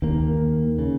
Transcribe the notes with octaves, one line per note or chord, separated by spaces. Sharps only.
D#2 D#3 A#3
C#3